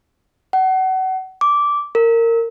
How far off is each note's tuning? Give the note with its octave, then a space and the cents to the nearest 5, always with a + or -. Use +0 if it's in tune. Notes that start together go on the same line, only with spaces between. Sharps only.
F#5 +30
D6 -10
A#4 -20